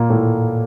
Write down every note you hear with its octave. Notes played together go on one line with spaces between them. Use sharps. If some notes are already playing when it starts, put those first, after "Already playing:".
Already playing: A#2 A#3
A2 A3